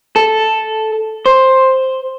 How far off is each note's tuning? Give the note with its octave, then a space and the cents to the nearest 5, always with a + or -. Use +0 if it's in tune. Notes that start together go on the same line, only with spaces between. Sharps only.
A4 -5
C5 +5